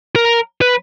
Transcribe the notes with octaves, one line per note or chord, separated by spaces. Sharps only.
A#4
B4